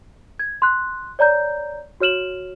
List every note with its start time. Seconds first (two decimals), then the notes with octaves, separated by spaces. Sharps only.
0.39 G#6
0.62 C6 F#6
1.19 C#5 D5 A#5 G6
2.00 F#4 C#5 F6 E7 F#7